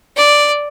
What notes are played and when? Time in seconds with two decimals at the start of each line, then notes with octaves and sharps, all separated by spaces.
0.16 D5